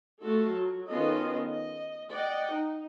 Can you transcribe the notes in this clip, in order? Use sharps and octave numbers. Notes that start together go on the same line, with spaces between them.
A3 F4 F#4 A4
F#3
D#3 B3 C#4 F4 A4 D#5
D#5
D5 D#5 F#5 G5
D#4